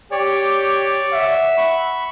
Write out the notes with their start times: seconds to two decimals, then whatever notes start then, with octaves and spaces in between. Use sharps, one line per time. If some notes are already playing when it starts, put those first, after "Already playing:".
0.12 G4 C#5 D5
1.12 E5 F#5
1.58 B5 C#6